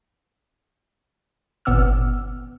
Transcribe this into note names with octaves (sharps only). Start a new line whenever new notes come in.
G1 A#2 B3 D6 E6 F6